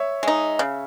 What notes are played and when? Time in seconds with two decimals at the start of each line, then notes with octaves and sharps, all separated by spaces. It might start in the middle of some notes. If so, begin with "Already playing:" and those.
Already playing: C#5 E5
0.23 G#3 D#4
0.59 C#3